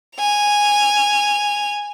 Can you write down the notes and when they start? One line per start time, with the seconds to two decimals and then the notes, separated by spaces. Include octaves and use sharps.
0.18 G#5 F7